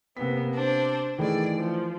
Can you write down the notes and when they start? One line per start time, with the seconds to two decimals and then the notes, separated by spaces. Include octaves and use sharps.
0.17 C3 A#3 B3 B6
0.53 D4 C5
1.18 D#3 E3 A3 G#4 D5
1.57 F3